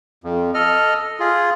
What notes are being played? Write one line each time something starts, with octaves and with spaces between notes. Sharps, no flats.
F2
A4 D#5 F6
F4 G#4